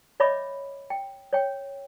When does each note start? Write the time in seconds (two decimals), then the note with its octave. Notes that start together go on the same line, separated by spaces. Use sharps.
0.20 C#5 D#5 E5 B5 D6
0.90 G5
1.33 C#5 G5